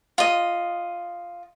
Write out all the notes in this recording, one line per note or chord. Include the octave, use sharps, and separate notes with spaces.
F4 D#5